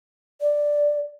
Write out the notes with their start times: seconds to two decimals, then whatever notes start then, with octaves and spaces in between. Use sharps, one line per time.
0.41 D5